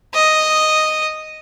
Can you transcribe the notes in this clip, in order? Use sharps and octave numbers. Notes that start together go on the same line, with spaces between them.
D#5